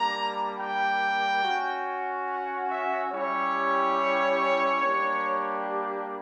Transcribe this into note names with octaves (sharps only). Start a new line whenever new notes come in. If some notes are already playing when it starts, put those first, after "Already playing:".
Already playing: G3 A#3 D4 A#5
G5
C#4 F#4
F#5
E5
G3 C#4 E4 G4 C#5
G3 A#3 D4 G4